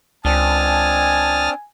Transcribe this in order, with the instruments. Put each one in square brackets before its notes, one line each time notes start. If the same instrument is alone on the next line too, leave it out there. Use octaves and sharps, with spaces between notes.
[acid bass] C#2 [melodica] C4 D4 [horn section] G#5 [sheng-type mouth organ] A5 D#6 F6